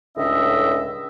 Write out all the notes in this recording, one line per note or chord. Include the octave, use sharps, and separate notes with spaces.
C#2 A2 D3 C#4 D#5 E5